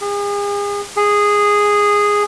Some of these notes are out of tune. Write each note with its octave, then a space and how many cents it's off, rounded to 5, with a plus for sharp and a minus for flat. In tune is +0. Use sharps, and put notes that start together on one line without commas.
G#4 -40
G#4 -10